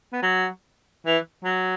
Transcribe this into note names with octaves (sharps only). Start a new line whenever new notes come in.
B3
F#3
E3
F#3